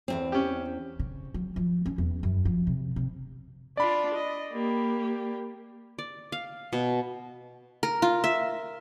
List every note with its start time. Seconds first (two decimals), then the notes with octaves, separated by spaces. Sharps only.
0.08 E2 G#2 C4
0.32 C#4 G4
0.99 C#3
1.34 F#3
1.56 F3
1.86 C#4
1.98 E2
2.23 F#2
2.45 F3
2.67 C3
2.96 C3
3.77 D4 F4 D5 B5
4.15 D#5
4.52 A#3 G4
5.99 D5
6.32 F5
6.73 B2
7.83 A#4
8.02 F4
8.24 E5